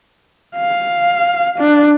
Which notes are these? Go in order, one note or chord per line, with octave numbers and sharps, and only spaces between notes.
F5
D4